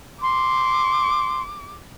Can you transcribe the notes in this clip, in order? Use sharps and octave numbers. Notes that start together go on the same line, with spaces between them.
C6 D6